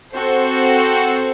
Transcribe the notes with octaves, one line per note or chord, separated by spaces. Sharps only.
C4 F#4 A4 C5